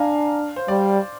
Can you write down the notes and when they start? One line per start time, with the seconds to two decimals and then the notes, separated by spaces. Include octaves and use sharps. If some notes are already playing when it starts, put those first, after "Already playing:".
Already playing: D4 F5 G#5 A#5
0.56 C5
0.68 G3 D5